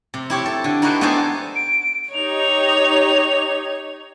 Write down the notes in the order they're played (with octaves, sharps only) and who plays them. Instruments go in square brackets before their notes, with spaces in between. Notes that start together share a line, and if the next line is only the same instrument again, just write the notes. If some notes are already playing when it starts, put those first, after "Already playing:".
[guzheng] C3
E4 G4 C#5
A4
D3
D#4 E4 F#4 G4 B4 C5
B3 D4 F#4 A4 C5 G#5
[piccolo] D7
[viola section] D#4 G4 [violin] C#5 [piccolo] F7